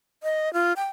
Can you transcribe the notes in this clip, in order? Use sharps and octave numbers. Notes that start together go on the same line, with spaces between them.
D#5
F4
G5